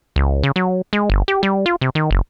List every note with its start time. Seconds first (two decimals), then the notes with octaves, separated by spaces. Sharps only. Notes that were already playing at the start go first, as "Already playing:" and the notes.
0.16 C#2
0.43 C#3
0.56 F#3
0.93 G#3
1.10 G1
1.28 G4
1.43 G3
1.66 F4
1.81 C3
1.95 D#3
2.11 F#1